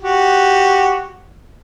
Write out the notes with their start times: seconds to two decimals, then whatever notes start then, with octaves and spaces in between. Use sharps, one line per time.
0.02 F#4 G4